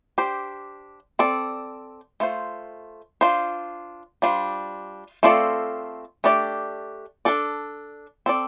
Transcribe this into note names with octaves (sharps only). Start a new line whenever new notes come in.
D4 G4 C5
C4 A4 D5
A3 F4 C5
D4 F4 C5
G3 D4 F4 C5
A3 C4 F4 A4 D5
A3 D4 G4 D5
D4 A4 D5
C4 A4 D5